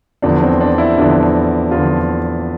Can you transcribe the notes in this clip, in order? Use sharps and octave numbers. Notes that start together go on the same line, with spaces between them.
E2 D3 F3 D4
C4
D4
E4
E2 D3 F3
E2 D3 F3 F4